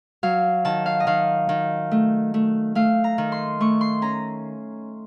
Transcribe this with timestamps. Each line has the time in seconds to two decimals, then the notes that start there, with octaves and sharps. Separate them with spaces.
0.23 F#3 F5
0.65 D#3 A5
0.86 F5
1.00 D#5
1.07 D#3 F5
1.49 D#3
1.91 A3
2.34 A3
2.75 A3 F5
3.04 A#5
3.18 D#3
3.32 C6
3.60 A3 C#6
3.81 C6
4.02 C#4 A#5